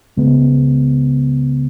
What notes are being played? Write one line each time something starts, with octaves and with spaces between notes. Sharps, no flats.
C#2 C#3 G#3 B3